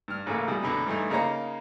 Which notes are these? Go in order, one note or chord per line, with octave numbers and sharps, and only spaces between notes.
G2 F6
A1 A2 C#3 E3 A3 A#3
B2 G3 G#3
F#2 B2 D3
G2 E3 A3 D#4
C#3 A#3 D#4 C#5 D#5 A#5